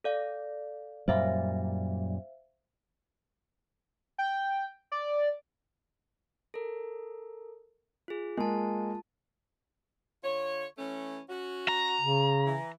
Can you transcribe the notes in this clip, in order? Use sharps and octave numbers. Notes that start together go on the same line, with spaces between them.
A4 D5 F5
F#2 A#2 G3 C5 E5 F5
G5
D5
A4 A#4
F4 G#4
G#3 A#3 F4 A5
D3 F4 C#5
E3 A3 C#4
C#4 F#4
A#5
C#3
E3